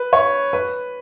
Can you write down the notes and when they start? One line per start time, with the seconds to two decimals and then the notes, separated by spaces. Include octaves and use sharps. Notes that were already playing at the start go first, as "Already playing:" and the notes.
Already playing: B4
0.13 C#5
0.53 B4